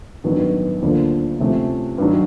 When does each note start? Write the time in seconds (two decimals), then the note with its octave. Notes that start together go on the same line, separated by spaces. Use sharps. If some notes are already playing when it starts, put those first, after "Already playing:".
0.24 A1 G2 D#3 F#3 B3
0.82 D2 D3 F3 A#3
1.40 C3 F3 A3 C#4 E4
1.98 G2 D#3 F#3